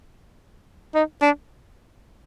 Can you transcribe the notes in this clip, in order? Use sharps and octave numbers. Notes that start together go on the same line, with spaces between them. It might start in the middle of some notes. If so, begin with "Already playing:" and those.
D#4
D4